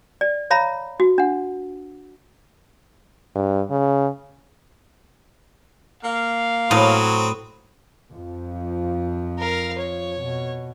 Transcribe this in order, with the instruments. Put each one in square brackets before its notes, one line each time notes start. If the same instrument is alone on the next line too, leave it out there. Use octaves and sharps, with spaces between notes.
[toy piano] D5
C#5 F5 A#5 B5
F#4
D4 F#5
[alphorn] G2
C#3
[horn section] A#3 F5
[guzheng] A2 [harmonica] F#3 C4 [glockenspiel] B5 D#6 D#7
[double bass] F2 F3
[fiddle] A#4 F5
C#5
[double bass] B2